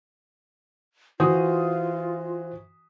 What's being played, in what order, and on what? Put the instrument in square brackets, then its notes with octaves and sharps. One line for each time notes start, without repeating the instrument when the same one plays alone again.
[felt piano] E3 F#4 D#6 [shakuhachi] F4 [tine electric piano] C5